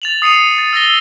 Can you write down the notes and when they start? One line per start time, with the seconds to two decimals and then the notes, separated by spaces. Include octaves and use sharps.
0.02 A6 F7 F#7
0.22 D#6 C7 C#7 D#7 F7
0.58 A6
0.73 E6 A6 A#6 G7